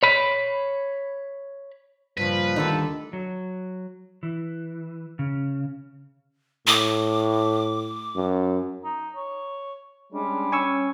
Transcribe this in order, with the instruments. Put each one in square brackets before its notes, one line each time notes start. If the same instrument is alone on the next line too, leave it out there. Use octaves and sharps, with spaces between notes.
[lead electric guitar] C#5 B5
[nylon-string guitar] G2 C#3 [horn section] A#2 F3 [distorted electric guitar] B4
[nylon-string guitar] D2 D#3 D#4 [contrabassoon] D3 [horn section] G3 F4 A4
[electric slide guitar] F#3
E3
C#3
[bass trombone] A2 [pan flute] D6
[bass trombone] F#2
[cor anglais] D#4
C#5
[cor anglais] G3 [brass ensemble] G#3 C#4 D4
[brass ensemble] C#4 [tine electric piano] G#5 C#6 E6